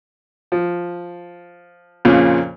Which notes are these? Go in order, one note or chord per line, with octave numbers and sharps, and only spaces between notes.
F3
F2 A#2 C#3 A#3 C#4